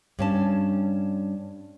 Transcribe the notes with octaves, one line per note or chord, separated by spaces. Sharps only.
G2 C#4 A5